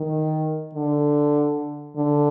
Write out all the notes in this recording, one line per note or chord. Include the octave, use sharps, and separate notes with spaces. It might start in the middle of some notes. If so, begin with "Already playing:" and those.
Already playing: D#3
D3
D3